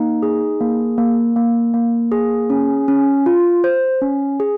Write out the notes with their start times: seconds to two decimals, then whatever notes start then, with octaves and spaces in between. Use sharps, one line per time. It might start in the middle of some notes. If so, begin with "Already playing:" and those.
Already playing: A#3 D#4
0.22 G#4
0.61 A#3
0.98 A#3
1.36 A#3
1.74 A#3
2.12 G#4
2.50 C#4
2.88 C#4
3.26 F4
3.64 C5
4.01 C#4
4.40 G#4